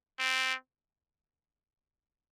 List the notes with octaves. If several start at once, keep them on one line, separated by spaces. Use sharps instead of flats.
C4